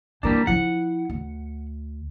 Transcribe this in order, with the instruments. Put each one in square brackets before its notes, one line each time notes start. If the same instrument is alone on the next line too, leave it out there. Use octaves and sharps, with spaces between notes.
[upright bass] E3 E4 [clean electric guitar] G3 A#3 D4
[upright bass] F3 E4 [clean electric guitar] F#5
[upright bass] D2